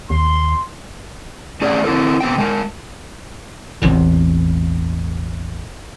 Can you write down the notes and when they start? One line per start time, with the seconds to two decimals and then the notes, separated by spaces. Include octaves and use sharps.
0.10 D#2 C6
1.62 A3 C#4 G#4 D5
1.84 C4 E4 A4 A#4
2.20 B2 B3 C4 G5
2.38 G#3 A#4
3.82 E1 A1 E2 C3